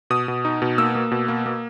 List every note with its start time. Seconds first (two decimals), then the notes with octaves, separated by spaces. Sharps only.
0.10 B2 D#6
0.28 B2
0.45 D#4
0.62 B2
0.78 A#3 E6
0.95 A#3
1.11 B2
1.28 A#3
1.46 A#3